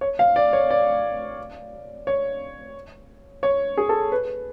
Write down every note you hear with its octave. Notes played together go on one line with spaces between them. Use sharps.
C#5
F5
D5
C#5
D5
C#5
C#5
G#4
A4
B4